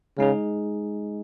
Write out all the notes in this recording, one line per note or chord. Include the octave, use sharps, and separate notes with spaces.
C#3 G#3 D#4 G#4